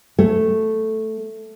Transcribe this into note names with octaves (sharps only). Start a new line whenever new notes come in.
A3